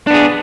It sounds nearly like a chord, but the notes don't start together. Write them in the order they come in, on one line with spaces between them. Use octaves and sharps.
D4 B3 G#4